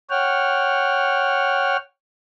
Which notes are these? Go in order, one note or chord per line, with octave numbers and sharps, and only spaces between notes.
C#5 F#5 G5 F6